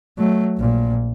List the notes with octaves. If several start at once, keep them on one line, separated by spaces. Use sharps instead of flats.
F#3 A3
A#1 A#2